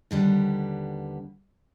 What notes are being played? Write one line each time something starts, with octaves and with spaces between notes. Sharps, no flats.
D#2 D3 G3 B3